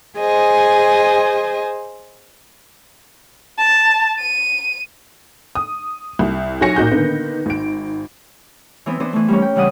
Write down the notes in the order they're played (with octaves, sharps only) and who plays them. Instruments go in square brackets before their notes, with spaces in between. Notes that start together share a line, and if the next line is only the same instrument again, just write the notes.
[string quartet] G#4 C5 D#5 G#5
[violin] A5
D#7
[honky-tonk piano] D#6
C2
B1 F#4 C#5 G#5 A#6 C#7
A#2 D#4 F#4 G6
D3 D#3 A#3 B3
G#1 D7
[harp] E3 B3 C4
E3 B3 D4 C5
E3 A3
G3 A#3 C#4
G5
C#3 E3 G3 D4 F#5 D#6